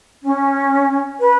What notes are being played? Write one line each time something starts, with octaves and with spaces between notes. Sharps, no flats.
C#4
B4